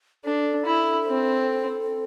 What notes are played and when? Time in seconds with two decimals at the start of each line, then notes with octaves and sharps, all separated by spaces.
0.24 D4 A4
0.66 E4
1.07 C4